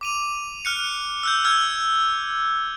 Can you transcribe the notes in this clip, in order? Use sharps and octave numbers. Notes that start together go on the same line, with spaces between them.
D6 D#7 F7
F6 F#6 C#7
E6 F#6 G6
E6 F6 G#6